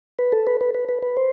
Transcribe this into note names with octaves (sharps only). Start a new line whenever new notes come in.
B4
A4
B4
B4
B4
B4
B4
C5